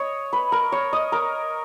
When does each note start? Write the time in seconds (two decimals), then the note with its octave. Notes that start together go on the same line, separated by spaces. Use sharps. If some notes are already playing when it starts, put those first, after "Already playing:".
Already playing: C#5 D#5
0.33 B4
0.52 A#4
0.72 C#5
0.93 D#5
1.12 A#4